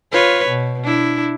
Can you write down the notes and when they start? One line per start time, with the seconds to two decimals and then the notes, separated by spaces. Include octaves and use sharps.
0.12 F4 B4 C#5
0.47 B2
0.83 D4 E4